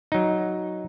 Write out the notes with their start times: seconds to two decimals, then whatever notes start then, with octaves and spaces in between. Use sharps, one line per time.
0.12 F#3 D#4